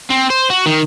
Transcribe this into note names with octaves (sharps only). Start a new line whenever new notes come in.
C4
C5
F#4
D#3